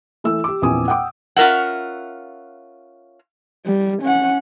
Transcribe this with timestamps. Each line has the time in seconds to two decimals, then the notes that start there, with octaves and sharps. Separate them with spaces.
0.24 E3 A3 E6
0.44 G4 D6
0.62 A#1 E2 A#2 C4 G#5 D#6
0.88 F#5 G5 D6
1.36 C#4 F4 A#4 E5 F#5
3.66 G3
4.02 C#4 F#5